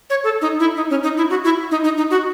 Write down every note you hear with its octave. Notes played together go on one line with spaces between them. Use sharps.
C#5
A4
D#4
E4
D#4
C#4
D#4
E4
F#4
E4
D#4
D#4
D#4
F#4